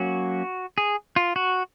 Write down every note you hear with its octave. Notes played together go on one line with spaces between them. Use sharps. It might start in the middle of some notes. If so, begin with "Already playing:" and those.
Already playing: F#3 A#3 C#4 F#4
G#4
F4
F#4